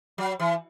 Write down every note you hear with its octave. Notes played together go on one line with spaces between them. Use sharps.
F#3
E3